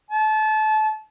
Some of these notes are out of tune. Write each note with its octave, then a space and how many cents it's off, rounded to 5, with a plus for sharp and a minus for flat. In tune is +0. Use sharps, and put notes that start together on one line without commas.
A5 -30